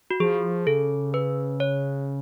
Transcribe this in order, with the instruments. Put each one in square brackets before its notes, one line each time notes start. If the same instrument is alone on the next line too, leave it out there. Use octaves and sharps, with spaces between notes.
[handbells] F#4
[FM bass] F3 [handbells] G#4
[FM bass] C#3 [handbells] A4
[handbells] B4
C#5